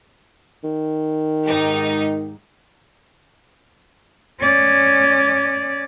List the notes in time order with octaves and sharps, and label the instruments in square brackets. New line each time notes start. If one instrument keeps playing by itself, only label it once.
[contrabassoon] D#3
[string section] G#2 D#4 G4
[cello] C#4 D5